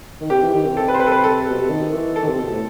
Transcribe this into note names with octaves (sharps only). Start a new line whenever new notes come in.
D#3
C3 G4
E3
D#3
C3
A4
B4
C5
B4
A4
B4
A4
B2
C3
D#3
E3
A4
D#3
C3
B2
A2